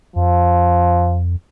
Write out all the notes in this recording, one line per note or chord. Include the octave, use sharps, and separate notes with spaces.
F2 F3